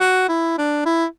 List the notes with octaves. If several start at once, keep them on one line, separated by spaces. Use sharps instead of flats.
F#4
E4
D4
E4